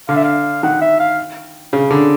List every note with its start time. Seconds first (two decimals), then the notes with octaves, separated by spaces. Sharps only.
0.09 D3 F5
0.16 E5
0.24 F5
0.63 D#3 F#5
0.81 E5
1.00 F5
1.73 C#3
1.91 D3